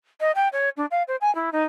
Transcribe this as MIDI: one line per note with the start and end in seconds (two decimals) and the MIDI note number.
0.21 0.32 75
0.35 0.48 79
0.53 0.69 73
0.77 0.86 62
0.91 1.03 77
1.08 1.16 72
1.21 1.33 80
1.35 1.50 64
1.53 1.64 63